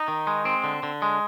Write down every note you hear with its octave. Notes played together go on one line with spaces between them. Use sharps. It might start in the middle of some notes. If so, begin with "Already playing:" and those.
Already playing: D#4
D#3
G#3
C4
D3
D3
G#3